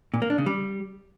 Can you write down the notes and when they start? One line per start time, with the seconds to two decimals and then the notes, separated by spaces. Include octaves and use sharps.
0.14 A#2
0.22 A#3
0.30 D4
0.38 C#3
0.46 G3